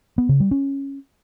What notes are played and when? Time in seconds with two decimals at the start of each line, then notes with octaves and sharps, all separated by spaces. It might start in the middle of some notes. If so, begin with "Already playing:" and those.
0.18 B3
0.29 C#3
0.40 G3
0.51 C#4